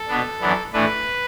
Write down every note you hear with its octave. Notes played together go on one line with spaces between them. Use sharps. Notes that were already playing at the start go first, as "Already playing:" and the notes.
Already playing: A4
B2 B3 D4
F#2 E3 B3 D4
A2 E3 A3 D4 B4